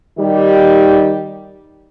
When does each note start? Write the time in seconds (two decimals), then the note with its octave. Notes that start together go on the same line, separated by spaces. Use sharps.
0.19 D#3 G3 D#4 G4